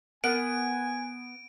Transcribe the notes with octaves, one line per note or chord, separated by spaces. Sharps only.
B3 A#4 G#5 D7